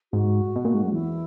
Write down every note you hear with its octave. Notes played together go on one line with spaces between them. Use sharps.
G#2 F#4
B2
A#2
G#2
F#2
E2 E4